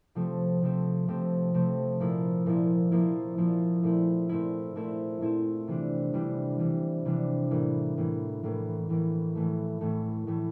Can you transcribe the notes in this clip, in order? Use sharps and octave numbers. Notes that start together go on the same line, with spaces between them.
C3 F3 A3 C4
C3 F3 A3 C4
C3 F3 A3 C4
C3 F3 A3 C4
A#2 F3 A#3 E4
A#2 F3 A#3 E4
A#2 F3 A#3 E4
A#2 F3 A#3 E4
A#2 A3 C4 E4
A#2 A3 C4 E4
A#2 A3 C4 E4
A#2 A3 C4 E4
C3 E3 G3 D4
C3 E3 G3 D4
C3 E3 G3 D4
C3 E3 G3 D4
A2 E3 A#3
A2 E3 A#3
A2 E3 A#3
A2 E3 A#3
A2 E3 A3
A2 E3 A3
A2 E3 A3